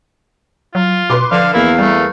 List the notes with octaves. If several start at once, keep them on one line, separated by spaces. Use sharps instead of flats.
F#3 F4
B2 B4 C6 D6
D3 F3 D4 F5
E2 A#3 E4 F5
G3 A3